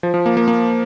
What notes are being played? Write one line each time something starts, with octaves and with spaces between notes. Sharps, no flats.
F3
F3
A#3
A#3
A#3